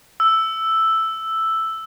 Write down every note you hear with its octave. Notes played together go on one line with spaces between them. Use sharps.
E6